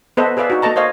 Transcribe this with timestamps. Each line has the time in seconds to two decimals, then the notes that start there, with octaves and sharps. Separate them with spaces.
0.17 B3 A4 B4 C5 D#5 E5
0.37 G#4 B4 D5 E5 F5
0.50 D#4 F#4
0.62 A#3 A4 D#5 A5 A#5
0.76 C5 C#5 D#5 F5